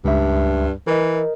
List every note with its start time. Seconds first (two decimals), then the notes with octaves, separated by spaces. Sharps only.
0.05 C#2 G2 E5
0.87 E3 A#4 D#5